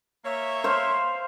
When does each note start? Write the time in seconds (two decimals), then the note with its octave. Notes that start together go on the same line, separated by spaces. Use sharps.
0.25 A#3 C#5 E5
0.64 C5 F5